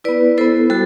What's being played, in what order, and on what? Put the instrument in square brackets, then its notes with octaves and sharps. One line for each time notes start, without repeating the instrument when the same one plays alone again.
[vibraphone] B3 E4 B4 D5
B3 E4 A4 C5
G3 F#4 A4